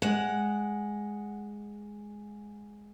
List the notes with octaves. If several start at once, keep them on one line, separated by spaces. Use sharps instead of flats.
G#3 F#5